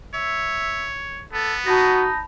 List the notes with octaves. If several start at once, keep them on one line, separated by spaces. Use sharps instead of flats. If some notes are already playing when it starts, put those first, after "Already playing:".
C#5 E5
B3 A4
D#4 F#4 A5 B5 A#6